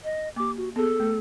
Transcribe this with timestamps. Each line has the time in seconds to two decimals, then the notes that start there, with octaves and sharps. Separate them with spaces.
0.04 D#5
0.36 A#3 G4 D6
0.57 F#4
0.76 B3 G#4 A4
1.00 A3